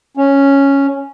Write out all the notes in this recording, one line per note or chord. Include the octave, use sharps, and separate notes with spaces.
C#4